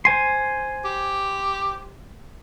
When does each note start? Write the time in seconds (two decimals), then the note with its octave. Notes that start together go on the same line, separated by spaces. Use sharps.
0.05 C5 G#5 C6
0.85 G4